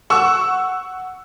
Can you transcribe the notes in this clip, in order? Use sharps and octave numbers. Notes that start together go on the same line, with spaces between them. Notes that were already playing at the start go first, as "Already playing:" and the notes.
F#5 C#6 E6